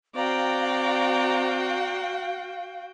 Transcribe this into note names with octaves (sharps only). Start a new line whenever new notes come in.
C4 F#4 D5 F5 G5 A#5